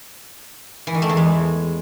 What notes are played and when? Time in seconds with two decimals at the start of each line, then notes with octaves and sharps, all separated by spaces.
0.87 E3
0.94 D#3
1.02 A3
1.09 E2
1.17 G#3